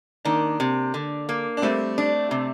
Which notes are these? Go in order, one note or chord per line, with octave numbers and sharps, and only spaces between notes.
D#3 A#3 D4
C3
D3
A#3
D4
G3 A3 C4
D4
C3